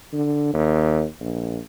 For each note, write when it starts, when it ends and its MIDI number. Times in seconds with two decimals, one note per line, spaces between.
0.13 0.50 50
0.54 1.04 39
1.21 1.58 34